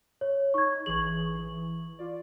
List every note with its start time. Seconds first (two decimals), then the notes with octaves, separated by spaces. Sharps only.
0.21 C#5
0.54 D#4 C#6 G#6
0.86 A1 E3 G#4 C#6 F#7
1.39 E3
1.99 F4 D5